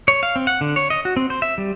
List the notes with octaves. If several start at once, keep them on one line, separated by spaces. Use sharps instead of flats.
C#5
F5
C4
F#5
D3
C#5
D#5
F#4
C4
C5
E5
G3